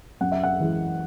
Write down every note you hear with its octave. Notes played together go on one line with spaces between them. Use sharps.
F#2 F#5
E5
F#5
E3 G#3